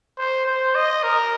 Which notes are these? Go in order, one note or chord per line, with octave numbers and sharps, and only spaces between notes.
C5
C5
D#5
A#4